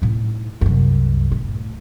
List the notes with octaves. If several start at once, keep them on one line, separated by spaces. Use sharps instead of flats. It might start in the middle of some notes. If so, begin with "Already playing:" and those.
A2 D#4
C2 F#2
A2